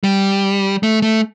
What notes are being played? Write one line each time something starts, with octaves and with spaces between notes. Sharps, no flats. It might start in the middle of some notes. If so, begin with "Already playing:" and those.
G3
A3
A3